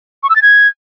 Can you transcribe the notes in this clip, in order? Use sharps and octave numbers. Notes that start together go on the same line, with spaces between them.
C#6
E6
A6
G#6